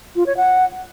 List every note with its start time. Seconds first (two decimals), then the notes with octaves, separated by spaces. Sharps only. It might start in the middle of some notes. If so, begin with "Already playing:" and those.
0.16 F4
0.26 C#5
0.37 F#5